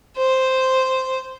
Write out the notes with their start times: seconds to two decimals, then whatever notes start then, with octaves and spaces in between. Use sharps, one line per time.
0.17 C5